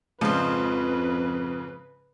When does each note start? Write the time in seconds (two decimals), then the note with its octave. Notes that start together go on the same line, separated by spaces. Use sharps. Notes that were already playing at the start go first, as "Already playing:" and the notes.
0.21 F2 G#2 C#3 F3 B4 C5